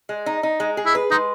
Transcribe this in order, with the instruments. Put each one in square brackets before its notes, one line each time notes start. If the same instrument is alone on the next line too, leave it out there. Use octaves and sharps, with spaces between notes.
[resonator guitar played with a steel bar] G#3
D#4
D#4
G#3
G#4
[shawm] E4
[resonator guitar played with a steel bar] B4
[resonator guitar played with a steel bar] G#3 [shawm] D#4